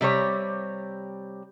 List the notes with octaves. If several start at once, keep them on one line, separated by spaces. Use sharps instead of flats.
C3 G3 C4 C#5